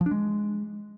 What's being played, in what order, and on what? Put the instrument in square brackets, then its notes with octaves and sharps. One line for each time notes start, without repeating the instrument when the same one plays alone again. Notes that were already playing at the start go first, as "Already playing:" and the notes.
[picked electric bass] F3
D4
G#3